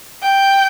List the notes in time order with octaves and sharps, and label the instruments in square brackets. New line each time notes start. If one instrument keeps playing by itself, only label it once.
[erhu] G5